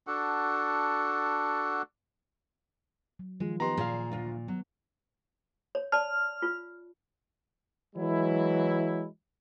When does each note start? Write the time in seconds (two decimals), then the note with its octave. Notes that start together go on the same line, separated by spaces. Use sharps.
0.07 D4 F#4 A4 F#5
3.19 F#3
3.40 D#3 F3 G#3 F4
3.60 B3 D#4 G4 A#5 C6
3.77 A#2 G#4 F5
4.12 D2 F4
4.48 F#3 B3
5.75 C#5
5.92 D5 A5 F6
6.42 F4
7.95 E3 F#3 G#3 E4